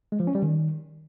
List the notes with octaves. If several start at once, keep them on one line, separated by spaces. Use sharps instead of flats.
G#3
F3
C#4
G3
D#3